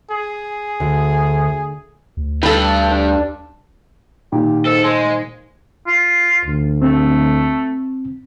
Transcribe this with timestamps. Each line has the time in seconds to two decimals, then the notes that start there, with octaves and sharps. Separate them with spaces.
0.11 G#4
0.80 D2
2.17 D2
2.43 G2 A4 B4
2.91 D4
4.32 A#2 D#3 G4
4.65 G#2 A4
4.84 G#3 C5
5.87 F4
6.45 D2
6.82 A3 C4